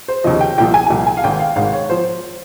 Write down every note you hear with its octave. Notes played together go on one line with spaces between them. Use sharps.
C5
D#2 C#3 F3 D#5
G5
C2 A#2 F3 G5
G#5
G#5
C2 A#2 F3 G5
G#5
F5
G#1 G#2 D#3 G5
F5
G#1 G#2 D#3 F5
C#5
F3 C5